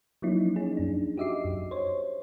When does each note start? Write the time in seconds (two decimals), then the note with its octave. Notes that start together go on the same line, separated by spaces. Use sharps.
0.22 F3 F#3 A#3 C#4 D#4 E4
0.56 C#4 D#4 G#4
0.77 F#2 D4
1.17 F#4 G4 D#5 E5 D6 C7
1.45 F#2
1.71 C5 C#5